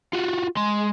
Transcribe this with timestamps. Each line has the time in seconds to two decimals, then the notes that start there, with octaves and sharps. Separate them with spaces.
0.13 F4 F#4
0.57 G#3 C6